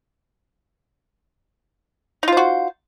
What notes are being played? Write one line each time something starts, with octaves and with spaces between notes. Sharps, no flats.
D#4 F4 F#4 C5